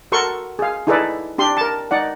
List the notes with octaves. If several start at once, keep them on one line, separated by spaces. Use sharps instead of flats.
F#4 A4 A#4 C6 C#6
G#4 F5
D#4 E4 G#4 A4 B4 D5
D4 G4 C6
A#4 A5
D#4 D5 F#5